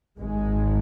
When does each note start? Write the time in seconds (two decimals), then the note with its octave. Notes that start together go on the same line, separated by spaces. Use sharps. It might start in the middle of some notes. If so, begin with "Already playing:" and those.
0.18 G#1 G#2 G#3